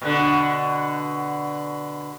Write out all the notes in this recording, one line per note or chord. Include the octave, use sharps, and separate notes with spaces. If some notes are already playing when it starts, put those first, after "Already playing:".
B2 D3